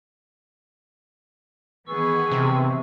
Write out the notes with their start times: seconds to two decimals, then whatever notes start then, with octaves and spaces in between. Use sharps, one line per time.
1.87 D#3 E3 B3 G#4 C#6 E6
2.31 C3